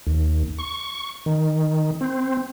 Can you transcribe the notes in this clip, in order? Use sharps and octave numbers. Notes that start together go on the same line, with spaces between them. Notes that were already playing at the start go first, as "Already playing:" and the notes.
D#2
C#6
D#3
C4